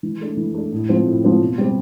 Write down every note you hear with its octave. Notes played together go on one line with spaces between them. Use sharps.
E3
A3 D4
E3
A3 D4
A2
F3 C4
A2
F3 C4
B2
G3 C4